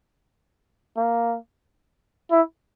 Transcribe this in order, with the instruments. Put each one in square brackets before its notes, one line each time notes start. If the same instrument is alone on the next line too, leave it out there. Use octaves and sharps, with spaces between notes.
[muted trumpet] A#3
E4